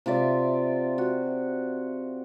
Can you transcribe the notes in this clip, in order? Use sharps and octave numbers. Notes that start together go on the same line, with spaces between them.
C3 F4 D5 E5
F#4